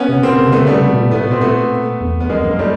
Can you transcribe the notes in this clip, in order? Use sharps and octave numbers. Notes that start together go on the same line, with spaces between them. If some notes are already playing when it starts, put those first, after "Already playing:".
Already playing: B3 C#4
C3
B2 A#3 C4
C#3
C3
C#3 A3 B3
C#3 G3 A3
C3
B2
A#2
A2 A3 B3
B2 C4
A#2 A3 B3
E2
E2 B3
F2 G#3 A#3
F2
F#2
A#3
G3 A3